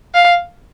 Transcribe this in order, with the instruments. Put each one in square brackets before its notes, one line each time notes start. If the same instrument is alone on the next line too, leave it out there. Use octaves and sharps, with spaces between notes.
[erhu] F5